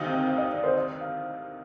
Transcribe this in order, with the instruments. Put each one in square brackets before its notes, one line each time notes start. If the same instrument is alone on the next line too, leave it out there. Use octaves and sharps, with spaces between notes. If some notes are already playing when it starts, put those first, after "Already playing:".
Already playing: [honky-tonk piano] D2 C3 D#3 D#4 [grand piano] D#5 F5
[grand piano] G5
F5
D#5
D5
C5
D#5
F5